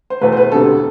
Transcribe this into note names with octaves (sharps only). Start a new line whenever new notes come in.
C5
E2 B2 A3 B4
C5
B4
E1 D2 C3 A4